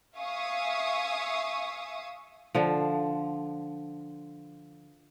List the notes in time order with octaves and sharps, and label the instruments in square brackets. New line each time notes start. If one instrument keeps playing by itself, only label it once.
[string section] E5 F5 G#5 C#6 D#6 E6
[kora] D3 F3